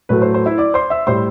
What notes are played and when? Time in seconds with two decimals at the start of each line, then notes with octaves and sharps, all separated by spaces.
0.09 A2 F#3 A3 B4
0.22 C5
0.34 C5
0.46 E4 E5
0.58 D5 D6
0.74 C5 C6
0.90 E5 E6
1.07 A2 G3 C5 C6